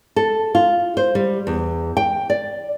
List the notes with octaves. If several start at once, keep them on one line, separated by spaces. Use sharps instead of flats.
A4
F4
C5
G3
E2
G5
D5